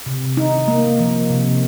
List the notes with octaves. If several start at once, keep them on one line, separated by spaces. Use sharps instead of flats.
C3
D#4
A#3
F3
C3